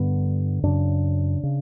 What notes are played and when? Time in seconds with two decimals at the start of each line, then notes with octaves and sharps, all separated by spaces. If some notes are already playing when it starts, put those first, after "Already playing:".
Already playing: G2 D3 B3
0.63 F#2 C#3 D4
1.43 C#3